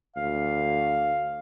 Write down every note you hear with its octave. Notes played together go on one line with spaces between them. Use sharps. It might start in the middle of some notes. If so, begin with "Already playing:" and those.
D2 F5